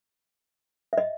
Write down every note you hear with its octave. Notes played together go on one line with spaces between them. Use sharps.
E5
D#5